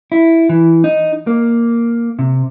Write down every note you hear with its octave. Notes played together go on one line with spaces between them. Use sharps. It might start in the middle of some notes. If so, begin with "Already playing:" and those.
E4
E3
D#4
A#3
C3